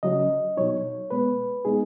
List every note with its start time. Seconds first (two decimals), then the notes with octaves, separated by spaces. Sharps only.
0.03 C#3 F#3 C#4 D#5
0.57 B2 F#3 D#4 C#5
1.11 B2 G#3 B3 B4
1.65 B2 G#3 B3 D#4 G#4